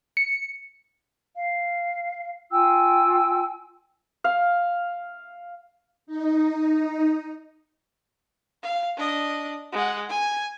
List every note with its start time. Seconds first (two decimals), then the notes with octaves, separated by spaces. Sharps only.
0.17 C#7
1.36 F5
2.52 F4 G5 G#5 E6
4.24 F5
6.07 D#4
8.63 F5
8.97 D4 D#5
9.73 G#3 F#5
10.09 G#5